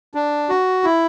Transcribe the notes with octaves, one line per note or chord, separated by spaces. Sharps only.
D4
F#4
E4